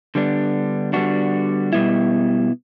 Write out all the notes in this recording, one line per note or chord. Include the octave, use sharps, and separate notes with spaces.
D3 G3 B3 D4
D3 G3 B3 D4 F#4
B2 G3 B3 E4